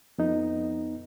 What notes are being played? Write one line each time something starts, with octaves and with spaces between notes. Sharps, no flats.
F2 B3 D#4